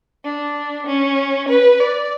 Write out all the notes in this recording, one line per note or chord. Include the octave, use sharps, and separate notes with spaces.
D4
C#4
B4
D5